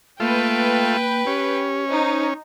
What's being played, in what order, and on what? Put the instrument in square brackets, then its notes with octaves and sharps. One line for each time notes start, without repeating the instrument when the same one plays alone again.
[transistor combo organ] A3 F4 [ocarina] A#3 [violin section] B4 G5
[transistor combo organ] C#4 [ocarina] G4
[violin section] D#4 [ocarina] C5